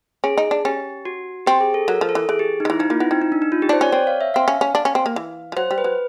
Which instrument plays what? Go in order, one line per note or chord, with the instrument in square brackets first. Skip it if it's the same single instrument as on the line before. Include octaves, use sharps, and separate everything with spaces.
[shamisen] C#4 [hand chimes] G#4
[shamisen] D#4
D4
[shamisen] C#4 [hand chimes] G4
[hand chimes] F#4
[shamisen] C4 [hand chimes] G4
[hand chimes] G#4
A4
[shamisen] F#3 [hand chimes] A#4
[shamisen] F3
[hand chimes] A4
[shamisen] E3
[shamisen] E3 [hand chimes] G#4
[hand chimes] G4
[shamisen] D#3 [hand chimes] D#4
[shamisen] E3 [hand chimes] E4
[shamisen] F3 [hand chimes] D#4
[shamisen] A#3 [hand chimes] F4
[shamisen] B3 [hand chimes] E4
[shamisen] C4 [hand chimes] D#4
[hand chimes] D#4
D4
D#4
F4
G4
[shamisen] D4 [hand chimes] C5
[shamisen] C#4 [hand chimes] D5
[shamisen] C4 [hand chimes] C#5
[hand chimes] F5
E5
[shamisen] C4 [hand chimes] F5
[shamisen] C#4
C#4
D4
C#4
C4
A#3
E3
F3
[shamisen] F#3 [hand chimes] C5
[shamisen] G3
[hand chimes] B4
[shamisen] F#3